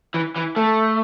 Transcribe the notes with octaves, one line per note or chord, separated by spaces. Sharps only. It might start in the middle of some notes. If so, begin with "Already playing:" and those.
E3
E3
A3